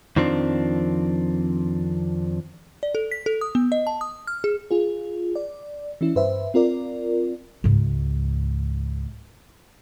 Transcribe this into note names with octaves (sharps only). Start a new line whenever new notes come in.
F2 D#3 F3 C4 D4
D5
A4
B6
A4
D#6
B3
D#5
A5
D#6
F6
G#4
F4 G#4
D5
E3 C#4 E4
G2 B4 C5 E5
C4 F4 A#4 D5
C#2 G#2